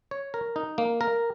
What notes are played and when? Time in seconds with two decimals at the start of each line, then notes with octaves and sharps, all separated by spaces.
0.11 C#5
0.34 A#4
0.56 D#4
0.78 A#3
1.01 A#4